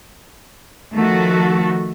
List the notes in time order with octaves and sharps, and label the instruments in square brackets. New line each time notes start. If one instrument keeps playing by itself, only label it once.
[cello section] D#3 F3 A3 F#4 A4